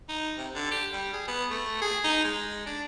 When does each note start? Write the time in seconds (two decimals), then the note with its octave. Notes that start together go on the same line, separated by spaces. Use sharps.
0.09 D#4
0.38 C3
0.55 D3
0.71 G4
0.93 G3
1.13 G#4
1.27 B3
1.51 A3
1.82 G#4
2.04 D#4
2.24 G#3
2.66 D4